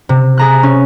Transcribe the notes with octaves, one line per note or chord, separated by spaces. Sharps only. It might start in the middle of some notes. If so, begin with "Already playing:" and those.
C3
G#4 A#5 F#6
C#4